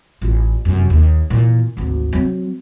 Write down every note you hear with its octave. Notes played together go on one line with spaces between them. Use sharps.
A1 F4
F1 F#2
D#2
A#2 E3
G#1 D2
F#3 C4